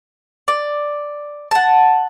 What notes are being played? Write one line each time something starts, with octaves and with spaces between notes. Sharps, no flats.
D5
F#5 A5